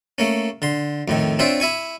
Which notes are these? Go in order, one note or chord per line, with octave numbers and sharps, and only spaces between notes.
A3 A#3 C#4
D3 C6
F2 A2 D#3
C4 D4 F4 C5 C#5 E5
E4 E5 G#5 C#6